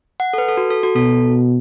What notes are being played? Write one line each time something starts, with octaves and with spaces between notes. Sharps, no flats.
F#5
A4
B4
A4
F#4
A4
F#4
B2 A4